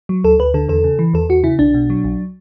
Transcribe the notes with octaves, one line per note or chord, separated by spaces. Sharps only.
F#3
D2 A4
D2 B4
D3 A4
E2 A4
C#3
E3
E2 A4
E2 F#4
C#3 E4
B1 D4
B2
F#3
B1